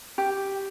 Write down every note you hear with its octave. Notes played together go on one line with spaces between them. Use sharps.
G4